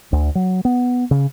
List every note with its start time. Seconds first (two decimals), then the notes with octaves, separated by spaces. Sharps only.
0.12 D2
0.35 F#3
0.65 B3
1.11 C#3